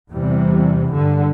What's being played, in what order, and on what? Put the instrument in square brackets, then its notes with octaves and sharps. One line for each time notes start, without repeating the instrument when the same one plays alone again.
[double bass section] E2 C3 E3 G3
G2 D3